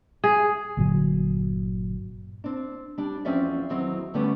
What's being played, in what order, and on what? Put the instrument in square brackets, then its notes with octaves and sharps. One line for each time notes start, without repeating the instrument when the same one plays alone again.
[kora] G#4
[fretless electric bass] G1 A#2 D3 F#3
[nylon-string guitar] C4 D4
G3 D4
E2 F3 C4 C#4 D5 E5
E2 D#3 F#3 C4
D3 G3 A3 B3 C#4